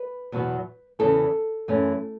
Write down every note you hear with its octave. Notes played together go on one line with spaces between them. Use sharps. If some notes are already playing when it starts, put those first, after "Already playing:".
Already playing: B4
E2 B2 F#3 B3
E2 C#3 E3 C#4 A4
F#2 E3 A3 C#4